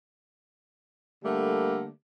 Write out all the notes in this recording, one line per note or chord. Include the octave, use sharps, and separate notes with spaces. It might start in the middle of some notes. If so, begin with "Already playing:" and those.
D3 G3 A3 A#3